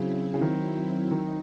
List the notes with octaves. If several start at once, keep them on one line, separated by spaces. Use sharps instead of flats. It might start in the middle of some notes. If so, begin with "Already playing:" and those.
Already playing: C#3 F#3 C4 E4
C#3
D#3
D#3 D#4